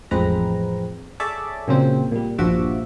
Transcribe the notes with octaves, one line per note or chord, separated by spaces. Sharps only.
A1 F2 G#3 C4 B4 A#5
G#4 A4 C#5 D5 E5 D6
A#2 C#3 F#3 C4
A#2 G3
A#1 G2 F3 F#4 E5 D6